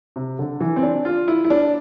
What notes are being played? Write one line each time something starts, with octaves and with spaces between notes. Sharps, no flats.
C3
D3
E3
C4
D4
F4
E4
E4
D4